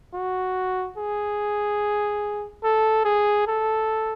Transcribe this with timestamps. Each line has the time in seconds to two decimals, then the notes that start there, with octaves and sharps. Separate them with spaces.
0.13 F#4
0.97 G#4
2.63 A4
3.05 G#4
3.47 A4